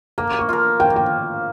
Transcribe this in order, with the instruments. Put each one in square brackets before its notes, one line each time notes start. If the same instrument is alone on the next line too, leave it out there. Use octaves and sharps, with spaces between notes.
[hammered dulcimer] A#3 [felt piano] A#5
[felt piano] C#6
[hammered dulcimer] F4 A#4
[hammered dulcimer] A#3 [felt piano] G5
[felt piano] G5